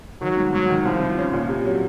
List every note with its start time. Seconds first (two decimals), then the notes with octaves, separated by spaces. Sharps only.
0.21 D#3 F#3
0.37 G#2
0.53 G#2 F#3
0.70 D#3
0.85 C2 F3
1.02 C2
1.18 C#4
1.34 A#2
1.49 C3
1.66 F#3